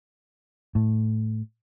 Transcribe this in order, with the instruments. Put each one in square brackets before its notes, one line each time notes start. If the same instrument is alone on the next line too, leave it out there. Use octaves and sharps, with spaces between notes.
[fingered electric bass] A2